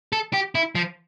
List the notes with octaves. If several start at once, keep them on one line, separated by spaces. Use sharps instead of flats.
A4
G4
E4
F3